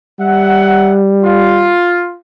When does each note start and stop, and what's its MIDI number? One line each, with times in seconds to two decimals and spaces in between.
0.20 1.74 55
0.20 0.96 76
0.20 0.96 78
1.23 2.17 65